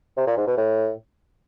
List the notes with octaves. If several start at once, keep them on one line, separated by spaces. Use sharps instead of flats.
C3
A#2
G#2
B2
A2